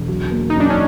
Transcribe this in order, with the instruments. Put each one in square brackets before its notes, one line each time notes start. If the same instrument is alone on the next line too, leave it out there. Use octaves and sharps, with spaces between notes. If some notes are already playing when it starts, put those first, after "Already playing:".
Already playing: [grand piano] E1
F#3
A#3
[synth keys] D#4
[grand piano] F#2 [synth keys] D4
[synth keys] C#4